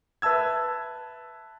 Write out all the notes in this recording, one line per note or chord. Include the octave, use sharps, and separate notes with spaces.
B4 E5 A5 E6 G#6